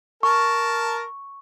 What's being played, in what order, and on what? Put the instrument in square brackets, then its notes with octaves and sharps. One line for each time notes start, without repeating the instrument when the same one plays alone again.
[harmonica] A#4 A5 [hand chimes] C#6